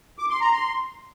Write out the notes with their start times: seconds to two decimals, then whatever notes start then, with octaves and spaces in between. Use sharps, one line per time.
0.19 D6
0.30 C6
0.41 A#5
0.52 C6